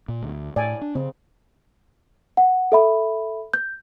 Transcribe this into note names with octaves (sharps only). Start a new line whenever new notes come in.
A#2
D2
A2 D5 G#5
D4
C#3 C4
F#5
A4 E5 B5
G6